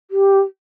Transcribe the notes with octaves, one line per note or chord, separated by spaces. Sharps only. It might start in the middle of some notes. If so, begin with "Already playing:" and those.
G4